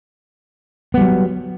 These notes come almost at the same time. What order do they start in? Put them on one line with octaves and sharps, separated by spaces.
B3 G3 F#3